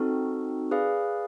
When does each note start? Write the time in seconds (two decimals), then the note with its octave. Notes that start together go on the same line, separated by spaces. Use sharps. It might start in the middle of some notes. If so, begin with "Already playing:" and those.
Already playing: C4 D#4 F#4 A4
0.71 G#4 B4 D5 F5